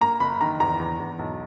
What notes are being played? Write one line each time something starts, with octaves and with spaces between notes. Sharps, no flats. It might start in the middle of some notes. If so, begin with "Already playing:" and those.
A#3 A#5
F#1 B5
D#3 A#5
E2 A#5
E2
E2
B1